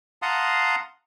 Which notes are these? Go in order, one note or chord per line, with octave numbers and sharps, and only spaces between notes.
F5 F#5 A5 A#5 C6 D#6